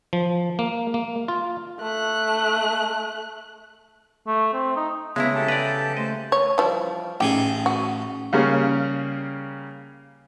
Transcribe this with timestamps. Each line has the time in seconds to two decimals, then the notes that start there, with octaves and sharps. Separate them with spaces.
0.13 F3
0.59 A#3
0.94 A#3
1.28 F4
1.80 A3 F#6
4.27 A3
4.54 C4
4.77 D#4
5.16 C#3 G#3 A3 B3 E4 E5 A#5
5.35 G4 A4 E5 A5
5.48 B4 D5 A#5
5.97 A3 C5 D#5 A5
6.32 C#5
6.58 E3 F3 G3
7.20 A1 D#4 G4 G#4
7.66 F#4
8.33 C#3 G3 A#3 C#4